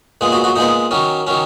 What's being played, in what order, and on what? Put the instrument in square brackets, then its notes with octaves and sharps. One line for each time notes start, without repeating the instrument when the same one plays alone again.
[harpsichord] A#2 G#3 B3
F#3 F#4
F#3 F#4
A#2 G#3 B3 D#4
D#3 F#3 C#4
D#3 F#3 C#4